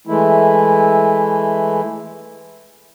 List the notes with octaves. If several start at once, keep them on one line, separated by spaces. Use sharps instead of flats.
E3 G#3 A3 E4